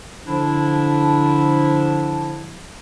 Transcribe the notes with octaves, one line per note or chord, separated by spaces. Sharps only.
D3 F3 D4 E4